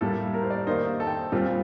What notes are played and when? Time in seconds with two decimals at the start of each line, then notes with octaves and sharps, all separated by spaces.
0.01 A2 G3 A#3 A4
0.34 A#4
0.42 C5
0.50 D5
0.67 D#3 A#3 D#4 C5
1.00 A4
1.07 G5
1.32 A#2 G3 C4 F4